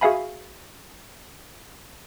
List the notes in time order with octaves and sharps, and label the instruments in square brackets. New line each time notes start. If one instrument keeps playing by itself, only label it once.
[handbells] F#4 G#4 E5 F5 G#5 B5